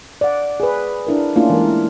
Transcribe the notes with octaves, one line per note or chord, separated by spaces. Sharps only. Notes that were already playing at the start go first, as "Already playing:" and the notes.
D5 F#5
G#4 B4
D4 E4 A#4
A3 A#3 C#4 D4 E4 F4
E3 G#3 A#4